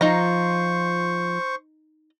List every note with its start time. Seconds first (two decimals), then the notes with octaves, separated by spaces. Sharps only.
0.01 F3 D#4 F4 C5 A#5 C#6